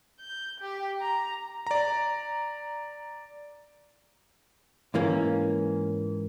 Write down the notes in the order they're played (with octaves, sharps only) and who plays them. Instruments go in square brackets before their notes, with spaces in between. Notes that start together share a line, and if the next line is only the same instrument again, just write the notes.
[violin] G6
G4
A#5
[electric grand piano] D5 A#5
[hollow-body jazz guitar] G#2 E3 A#3 C#4